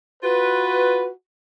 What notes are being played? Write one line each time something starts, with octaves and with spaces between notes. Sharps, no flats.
F4 F#4 B4